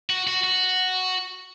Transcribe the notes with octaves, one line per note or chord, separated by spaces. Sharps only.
F#4
F#4
F#4